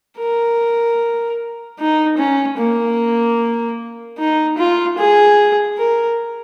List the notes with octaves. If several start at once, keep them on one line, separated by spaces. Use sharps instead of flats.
A#4
D#4
C#4
A#3
D#4
F4
G#4
A#4